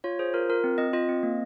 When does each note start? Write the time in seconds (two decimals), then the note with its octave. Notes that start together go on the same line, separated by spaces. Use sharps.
0.04 F4 C#5
0.19 G#4 C5
0.34 F4 A#4
0.49 F4 A#4
0.64 C4
0.78 C4 D#5
0.93 F4 D#5
1.09 C4
1.23 A#3